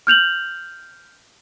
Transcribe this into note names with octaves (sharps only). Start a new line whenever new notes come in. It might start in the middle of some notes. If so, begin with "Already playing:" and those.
F6 G6 F7 F#7